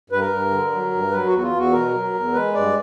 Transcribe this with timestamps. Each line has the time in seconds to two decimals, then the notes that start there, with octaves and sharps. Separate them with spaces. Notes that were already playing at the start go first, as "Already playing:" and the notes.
0.10 G2 B4
0.20 A#4
0.30 G2
0.51 D3
0.71 F#3
0.91 G2
1.11 F#3 B4
1.26 F#4
1.32 E2
1.38 F#4
1.42 F4
1.53 E2 F#4
1.73 B2 A#4
1.94 F#3
2.14 E2
2.34 G#3 B4
2.54 G2 D5